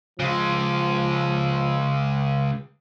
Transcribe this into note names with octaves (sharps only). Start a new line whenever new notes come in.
C#3 F3 G#3